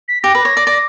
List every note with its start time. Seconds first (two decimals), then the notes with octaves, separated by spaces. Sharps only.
0.08 B6
0.23 G4 A#6
0.35 B4
0.45 C#5
0.57 D5
0.67 D5